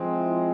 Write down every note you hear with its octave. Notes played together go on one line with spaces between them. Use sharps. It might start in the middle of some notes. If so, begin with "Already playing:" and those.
Already playing: F3 G#3 C4
E4